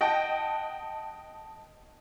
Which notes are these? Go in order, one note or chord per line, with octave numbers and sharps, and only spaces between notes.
D#5 F#5 G5 A5